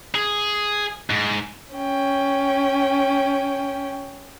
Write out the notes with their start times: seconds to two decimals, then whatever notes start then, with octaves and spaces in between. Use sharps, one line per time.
0.15 G#4
1.10 G#2
1.75 C#4 G5